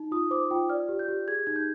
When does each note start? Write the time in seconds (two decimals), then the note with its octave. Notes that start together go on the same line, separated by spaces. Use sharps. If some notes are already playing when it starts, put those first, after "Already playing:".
Already playing: D#4
0.12 F4 D#6
0.31 C5 D6
0.51 F4 G5
0.70 D5 F6
0.89 G4
0.99 G6
1.08 G4
1.28 G#4 G#6
1.47 D#4 G#6
1.56 G6